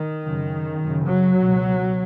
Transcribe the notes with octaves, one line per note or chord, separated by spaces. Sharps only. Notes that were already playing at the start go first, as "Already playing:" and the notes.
Already playing: D#3
F#2 C#3
F#2 C#3
F#3
C#2 B2